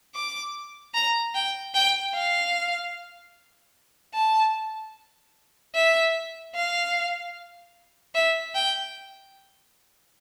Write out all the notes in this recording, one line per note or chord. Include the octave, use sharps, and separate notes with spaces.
D6
A#5
G5
G5
F5
A5
E5
F5
E5
G5